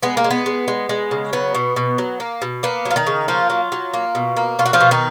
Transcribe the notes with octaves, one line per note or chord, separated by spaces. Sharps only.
G#3 B3
A#3
G#3
B3
G#3
G#3
G#3
C#3
F#3 B3
B2
B2
F#3
A#3
B2
A#3 B3
F#3
F4
D#3 D#4
C#3
F3 A#3 F4
F#3
F#3
A#3
B2
A#3
B2 F4
F#4
F3 F4
B2
D#3 D#4